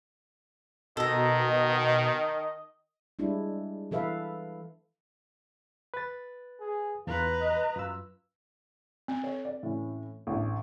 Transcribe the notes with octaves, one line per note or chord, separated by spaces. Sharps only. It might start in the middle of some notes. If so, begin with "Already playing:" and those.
B2 D#3 A4 D#5 A#5
G3 G#3 D4 E4
E3 A4 B4 E5 F5
B4 A6
G#4
E2 F4 B4 A#5
D#5
F#2 F4 E6
C4
A4 C#5
D5
A2 E3 C#4
A1 D2